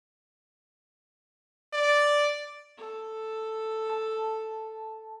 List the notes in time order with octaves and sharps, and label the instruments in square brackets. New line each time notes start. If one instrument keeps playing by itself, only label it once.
[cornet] D5
[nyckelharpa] A4
[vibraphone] A5